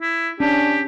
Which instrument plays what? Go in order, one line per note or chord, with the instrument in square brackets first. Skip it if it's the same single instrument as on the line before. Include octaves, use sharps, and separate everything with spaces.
[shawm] E4
[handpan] C#4 [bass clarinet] D4 [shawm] G4